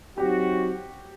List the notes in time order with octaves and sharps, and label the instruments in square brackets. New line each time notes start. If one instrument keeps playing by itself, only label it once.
[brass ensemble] F#3 C4 D#4 F#4 [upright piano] G4